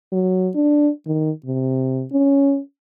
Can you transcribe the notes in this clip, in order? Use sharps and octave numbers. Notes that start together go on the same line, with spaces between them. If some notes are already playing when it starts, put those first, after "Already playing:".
F#3
D4
D#3
C3
C#4